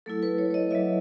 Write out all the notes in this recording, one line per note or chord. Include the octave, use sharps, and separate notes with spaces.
F#3 A3 E4 A4
B4
C#5
C#5
D#5
F#3 A3 E4 E5